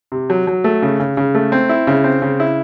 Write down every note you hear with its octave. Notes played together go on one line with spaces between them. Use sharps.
C3
F#3
F#3
A3
C#3
C#3
C#3
A3
C4
E4
C#3
C4
C#3
E4